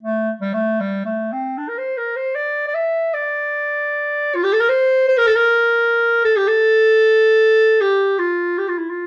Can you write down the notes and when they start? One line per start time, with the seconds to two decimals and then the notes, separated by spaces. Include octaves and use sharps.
0.03 A3
0.41 G3
0.54 A3
0.80 G3
1.05 A3
1.32 C4
1.58 D4
1.69 A#4
1.78 C5
1.97 A#4
2.16 C5
2.35 D5
2.68 D5
2.74 E5
3.14 D5
4.35 F4
4.43 G4
4.53 A4
4.60 A#4
4.69 C5
5.08 C5
5.18 A#4
5.27 A4
5.36 A#4
6.25 A4
6.37 G4
6.48 A4
7.81 G4
8.19 F4
8.58 G4
8.68 F4
8.79 E4
8.90 F4